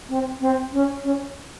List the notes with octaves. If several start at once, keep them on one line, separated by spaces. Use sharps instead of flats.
C4
C4
C#4
C#4